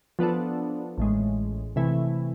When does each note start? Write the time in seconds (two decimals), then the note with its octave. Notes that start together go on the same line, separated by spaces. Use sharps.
0.19 F3 B3 D4 A4
0.98 A1 A2 G#3
1.76 C3 E3 A3 E4